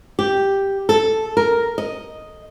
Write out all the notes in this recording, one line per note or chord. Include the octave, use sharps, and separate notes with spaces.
G4
A4
A#4
D#5